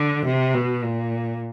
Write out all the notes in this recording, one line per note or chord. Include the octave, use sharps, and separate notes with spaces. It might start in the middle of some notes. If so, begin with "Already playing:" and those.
Already playing: D3
C3
B2
A#2